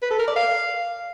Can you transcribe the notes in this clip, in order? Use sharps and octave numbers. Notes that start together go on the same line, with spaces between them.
B4
A4
A#4
D5
F5